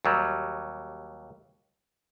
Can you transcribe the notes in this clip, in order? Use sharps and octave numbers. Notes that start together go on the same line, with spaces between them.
D#2 F#3 G3